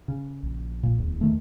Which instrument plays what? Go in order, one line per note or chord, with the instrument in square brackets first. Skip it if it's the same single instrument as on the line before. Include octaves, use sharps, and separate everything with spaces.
[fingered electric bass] C#3
[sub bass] A#1
[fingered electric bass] A#2
[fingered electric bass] D1 [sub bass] E2
[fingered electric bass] D#3 A3